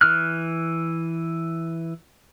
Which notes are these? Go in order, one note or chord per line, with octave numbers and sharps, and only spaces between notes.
E3 F6 F#6